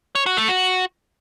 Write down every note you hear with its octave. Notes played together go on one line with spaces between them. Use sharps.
C#5
F#4
A3
F#4